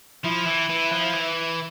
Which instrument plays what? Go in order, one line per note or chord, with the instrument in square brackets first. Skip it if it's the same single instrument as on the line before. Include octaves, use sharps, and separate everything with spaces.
[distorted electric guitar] F3 [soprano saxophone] E4
[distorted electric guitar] E3
E3
F3
E3